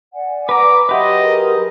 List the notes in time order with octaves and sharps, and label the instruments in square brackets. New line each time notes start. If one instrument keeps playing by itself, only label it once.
[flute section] D5 F#5 G#5
[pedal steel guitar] B4 A#5 [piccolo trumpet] D6
[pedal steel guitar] F#3 G4 B4 [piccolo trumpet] D#5 [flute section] E5 F#5 C6
[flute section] G#4 A#4 A#5